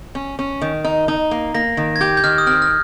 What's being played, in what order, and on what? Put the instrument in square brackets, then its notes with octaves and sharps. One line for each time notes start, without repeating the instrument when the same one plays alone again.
[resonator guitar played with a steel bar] C#4
C#4
D#3
D#4
D#4
A#3
[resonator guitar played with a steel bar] A#3 [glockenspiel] A#6
[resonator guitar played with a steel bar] D#3
[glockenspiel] G#6
[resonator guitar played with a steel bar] G4 [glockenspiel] G6
[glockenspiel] G6
[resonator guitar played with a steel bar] D#3 [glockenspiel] F6
[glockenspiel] D#6
[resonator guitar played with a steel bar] C4 [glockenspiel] F6
[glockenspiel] F6